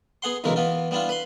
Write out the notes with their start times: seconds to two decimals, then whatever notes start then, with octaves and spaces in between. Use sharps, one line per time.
0.22 B3 G#4 F#5 C6
0.44 B1 E2 C#3 E3 G#3 A#4
0.56 E3 B3 F4
0.91 G3 B3 D4 E4 F4
1.09 B4 B5 C6